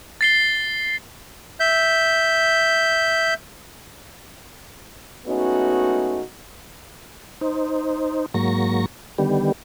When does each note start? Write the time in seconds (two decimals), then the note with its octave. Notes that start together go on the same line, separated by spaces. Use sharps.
0.21 A6 C7 G7
1.60 E5 G6
5.27 G#3 A3 B3 C#4 D#4 F#4
7.41 D#4 C5
8.34 G#2 F#3 A#3 C#6 A#6
9.18 D3 D#3 G3 B3 G4